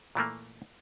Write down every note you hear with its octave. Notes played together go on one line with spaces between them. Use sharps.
A#2 E3 A3 A#3